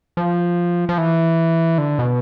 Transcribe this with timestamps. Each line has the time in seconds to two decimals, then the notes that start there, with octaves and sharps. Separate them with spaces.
0.17 F3
0.89 F3
0.98 E3
1.78 D3
1.99 B2